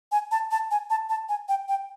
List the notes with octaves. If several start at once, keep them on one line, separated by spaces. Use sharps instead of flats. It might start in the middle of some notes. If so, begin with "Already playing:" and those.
G#5
A5
A5
G#5
A5
A5
G#5
G5
G5